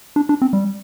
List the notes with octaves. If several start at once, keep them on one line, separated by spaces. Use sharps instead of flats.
D4
D4
C4
G3